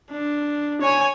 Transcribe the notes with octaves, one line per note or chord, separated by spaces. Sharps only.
D4
C#5 G#5